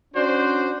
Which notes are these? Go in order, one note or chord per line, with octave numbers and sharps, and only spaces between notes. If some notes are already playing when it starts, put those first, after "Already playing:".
C#4 D4 F#4 C5